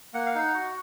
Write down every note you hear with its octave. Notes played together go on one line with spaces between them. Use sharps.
A#3 F#5
F5
D#4 F#5
F#4